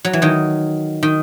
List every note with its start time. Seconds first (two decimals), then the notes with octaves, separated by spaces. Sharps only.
0.05 F#3
0.13 E3
0.22 D#3 F#3
1.03 D#3